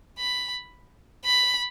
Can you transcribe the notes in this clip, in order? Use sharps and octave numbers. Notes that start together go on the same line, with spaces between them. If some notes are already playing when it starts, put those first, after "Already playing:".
B5
B5